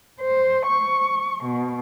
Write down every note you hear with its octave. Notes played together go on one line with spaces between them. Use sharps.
C5
C#6
B2